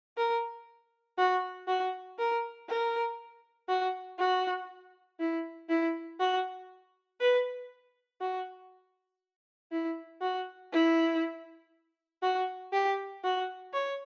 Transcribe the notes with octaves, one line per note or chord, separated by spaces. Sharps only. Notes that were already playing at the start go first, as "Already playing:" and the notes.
A#4
F#4
F#4
A#4
A#4
F#4
F#4
E4
E4
F#4
B4
F#4
E4
F#4
E4
F#4
G4
F#4
C#5